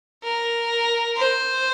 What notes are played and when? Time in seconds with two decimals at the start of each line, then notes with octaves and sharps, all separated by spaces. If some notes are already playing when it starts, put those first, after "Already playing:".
0.24 A#4
1.18 C5